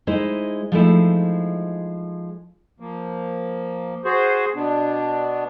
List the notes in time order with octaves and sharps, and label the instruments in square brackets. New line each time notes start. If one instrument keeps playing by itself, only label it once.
[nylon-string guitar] G#3 D#4 E4 C5
F3 G#3 A3 D#4 E4
[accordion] F3 A#3
F#4 G#4 C5
B2 B3 D4